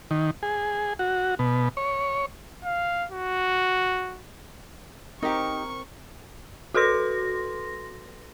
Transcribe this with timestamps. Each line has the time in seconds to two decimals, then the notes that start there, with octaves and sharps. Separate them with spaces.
0.11 D#3
0.43 G#4
0.99 F#4
1.39 B2
1.77 C#5
2.65 F5
3.12 F#4
5.23 C4 D#4 G4 A#4 C#6
6.74 F#4 A4 B4 C6 A#6